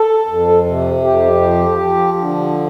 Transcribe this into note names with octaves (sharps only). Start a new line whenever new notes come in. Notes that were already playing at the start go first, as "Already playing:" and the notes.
Already playing: A4
F2
C3
F2 G4
F3
F3
D3